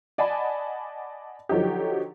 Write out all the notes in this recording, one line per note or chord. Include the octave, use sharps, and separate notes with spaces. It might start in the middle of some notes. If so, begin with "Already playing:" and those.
D5 D#5 F#5 G#5 A5 B5
D3 F3 F#3 D#4 G4